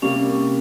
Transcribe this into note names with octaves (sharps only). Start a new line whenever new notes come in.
C3 G3 A#3 C#4